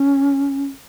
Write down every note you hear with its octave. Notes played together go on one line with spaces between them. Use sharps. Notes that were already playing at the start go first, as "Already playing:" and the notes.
Already playing: C#4